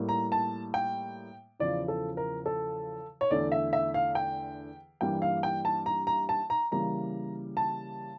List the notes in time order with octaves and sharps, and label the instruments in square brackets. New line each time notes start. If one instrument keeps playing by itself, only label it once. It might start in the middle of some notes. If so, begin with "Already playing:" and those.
Already playing: [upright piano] A2 G3 A#3
A#5
A5
G5
E2 C#3 F3 D5
A4
A#4
A4
C#5
E2 D3 A3 D5
E5
E5
F5
G5
G2 E3 G3 A#3 G5
F5
G5
A5
A#5
A#5
A5
A#5
C#3 E3 G3 A#3 A#5
A5